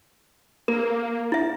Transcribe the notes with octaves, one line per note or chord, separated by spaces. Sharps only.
A#3 A#4
E4 E5